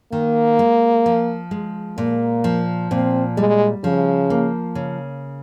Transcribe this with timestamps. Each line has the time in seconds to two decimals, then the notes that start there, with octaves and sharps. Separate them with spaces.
0.12 D#3 A#3
0.59 G#3
1.06 F3
1.51 G#3
1.98 A#2 A#3
2.44 F3
2.91 A#2 C4
3.37 G3 G#3
3.83 C#3 F3
4.30 A#3
4.75 C#3